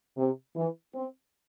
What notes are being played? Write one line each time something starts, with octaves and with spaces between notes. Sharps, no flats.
C3
E3
C4